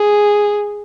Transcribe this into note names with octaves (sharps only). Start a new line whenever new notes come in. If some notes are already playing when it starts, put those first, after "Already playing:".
Already playing: G#4